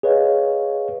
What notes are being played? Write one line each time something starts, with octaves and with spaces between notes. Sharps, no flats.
G#4 B4 C#5 D#5 F5